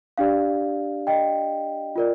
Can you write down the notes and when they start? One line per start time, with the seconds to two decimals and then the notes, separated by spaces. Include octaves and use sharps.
0.18 D4 G4 D5 F5
1.07 D#5 G5
1.96 F4 A#4 D5